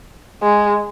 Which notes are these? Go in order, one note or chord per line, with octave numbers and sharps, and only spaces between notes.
G#3